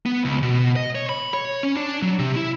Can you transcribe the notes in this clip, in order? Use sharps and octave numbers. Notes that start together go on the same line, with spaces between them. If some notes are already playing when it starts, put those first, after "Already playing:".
B3
C#2
B2
D#5
C#5
B5
C#5
C#4
D4
F#3
C3
E4